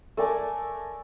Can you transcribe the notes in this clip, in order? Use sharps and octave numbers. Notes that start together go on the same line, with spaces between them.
A3 A#4 D5 G#5